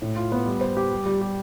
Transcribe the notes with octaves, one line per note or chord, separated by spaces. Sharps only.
A2
F4
B3
G3
C5
G4
G3
G3
G4